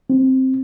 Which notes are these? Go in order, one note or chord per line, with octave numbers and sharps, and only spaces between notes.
C4